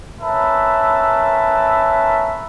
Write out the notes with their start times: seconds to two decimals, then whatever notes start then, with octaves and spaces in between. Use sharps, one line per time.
0.21 C#4 A#4 B4 E5 A5 B5